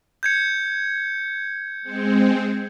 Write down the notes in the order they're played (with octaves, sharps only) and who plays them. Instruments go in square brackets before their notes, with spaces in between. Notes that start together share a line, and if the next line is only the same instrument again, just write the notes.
[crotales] G6 G#6 C#7
[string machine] G#3 C4